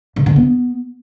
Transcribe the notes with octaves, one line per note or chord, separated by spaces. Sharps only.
C#3
D3
B3